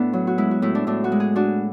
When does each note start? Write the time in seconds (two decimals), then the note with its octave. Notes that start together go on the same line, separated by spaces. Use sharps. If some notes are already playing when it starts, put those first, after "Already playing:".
Already playing: A2 B3 D4 E4
0.13 F#3
0.27 F#4
0.38 G#3 E4
0.51 F#4
0.62 A2 E4
0.75 D4
0.87 A2 D4
1.04 F#4
1.12 G#3
1.20 G#4
1.36 D4 F#4